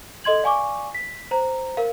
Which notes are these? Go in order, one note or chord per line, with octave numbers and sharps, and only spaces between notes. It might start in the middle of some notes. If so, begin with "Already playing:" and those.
A4 D#5 C6 G#6 F#7
D5 F5 G#5 C#6 D6
B6
C5 A#5
A#4 F5